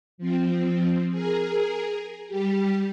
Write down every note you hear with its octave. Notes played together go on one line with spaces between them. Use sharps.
F3 C4
G#4 A#4
G3 G4